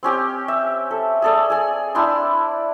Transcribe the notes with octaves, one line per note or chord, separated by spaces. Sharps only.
C4 C#4 G4 G5
E5
A4
G#4 A4 D5
G#4 G#5
D4 E4 G5 C6